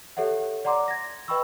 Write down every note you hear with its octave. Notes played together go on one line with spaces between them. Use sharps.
G4 A4 C#5 E5 F#5
D5 F#5 A#5 C6 D6
G#6 A#6
B4 D#5 G5 B5 C#6 E6